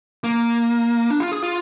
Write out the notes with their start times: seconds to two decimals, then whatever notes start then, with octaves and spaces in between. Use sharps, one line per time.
0.24 A#3
1.10 D4
1.20 F4
1.32 G#4
1.42 F4